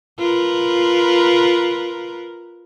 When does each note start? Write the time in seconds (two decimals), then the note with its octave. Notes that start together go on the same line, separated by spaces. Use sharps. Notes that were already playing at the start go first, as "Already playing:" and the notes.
0.19 F4 A#4 B4